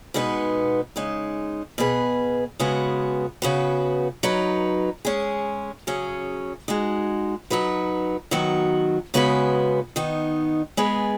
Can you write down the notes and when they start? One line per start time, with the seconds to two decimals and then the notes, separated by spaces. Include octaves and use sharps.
0.14 B2 G#3 B3 D#4 B4
0.96 C#3 G#3 D#4
1.78 B2 B3 G#4 B4
2.59 C#3 G#3 B3 F#4 B4
3.42 C#3 B3 F#4 B4
4.23 F#3 D#4 B4
5.05 G#3 C#4 G#4
5.87 C#3 F#3 C#4 G#4
6.68 G#3 D#4 F#4
7.50 F#3 D#4 F#4 B4
8.31 D#3 F#3 B3 F#4
9.14 C#3 G#3 B3 F#4 B4
9.96 D#3 B3 D#4
10.77 G#3 B3 G#4 B4